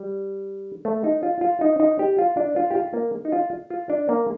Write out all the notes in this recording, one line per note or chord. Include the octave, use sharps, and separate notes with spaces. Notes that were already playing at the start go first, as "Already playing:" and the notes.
Already playing: G3
A3
D#4
F4
F4
D#4
D#4
G4
F4
D4
F4
G4
F4
A#3
D#4
F4
F4
D4
A#3